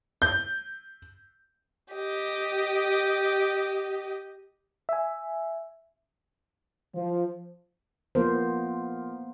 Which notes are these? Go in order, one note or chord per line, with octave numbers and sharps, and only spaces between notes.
G6
G4 D#5
E5 G#5
F3
F3 A#3 B3 A#4 C5